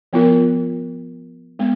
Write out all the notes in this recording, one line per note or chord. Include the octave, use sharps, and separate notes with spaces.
F3 B3 F4 A#4
G#3 B3